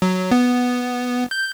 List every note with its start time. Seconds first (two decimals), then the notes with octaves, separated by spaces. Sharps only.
0.02 F#3
0.31 B3
1.31 G6